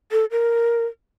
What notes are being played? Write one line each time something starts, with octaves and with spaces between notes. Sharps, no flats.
A4
A#4